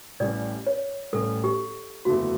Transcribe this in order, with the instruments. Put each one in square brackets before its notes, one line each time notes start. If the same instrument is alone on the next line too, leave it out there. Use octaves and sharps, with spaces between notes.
[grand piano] A1 A2 G3 C#4 [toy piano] D5
[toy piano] C#5
[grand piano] A1 A2 G3 C#4 [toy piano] A4
[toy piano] G4
[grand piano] F#1 E2 D3 A3 E4 [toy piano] F#4